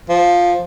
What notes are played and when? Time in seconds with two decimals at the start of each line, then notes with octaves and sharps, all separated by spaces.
0.09 F3